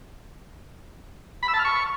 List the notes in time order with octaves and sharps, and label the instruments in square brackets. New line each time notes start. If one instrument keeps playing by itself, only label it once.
[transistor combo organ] B5
E6
A5
F6
C#6